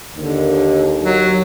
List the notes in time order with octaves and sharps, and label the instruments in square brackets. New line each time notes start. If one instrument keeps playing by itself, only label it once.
[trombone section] D#2 [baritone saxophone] D3
[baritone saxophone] F#3